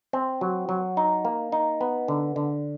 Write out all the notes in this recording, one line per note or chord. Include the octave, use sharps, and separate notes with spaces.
C4
F#3
F#3
D#4
A#3
D#4
B3
D3
D3